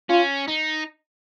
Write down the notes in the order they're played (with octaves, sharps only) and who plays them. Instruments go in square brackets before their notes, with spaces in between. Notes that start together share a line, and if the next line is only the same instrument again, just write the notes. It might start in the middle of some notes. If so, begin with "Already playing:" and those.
[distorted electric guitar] C#4 [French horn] F4
[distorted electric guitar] D#4